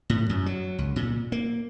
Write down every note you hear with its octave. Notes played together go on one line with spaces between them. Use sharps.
A2
F#2
F#3
C#2
A#2
A#3